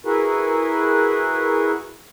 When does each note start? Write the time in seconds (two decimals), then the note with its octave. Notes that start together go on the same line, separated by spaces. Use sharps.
0.05 E4 F#4 G#4 A#4 B4